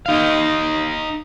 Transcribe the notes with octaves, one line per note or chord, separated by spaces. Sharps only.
D#4 F5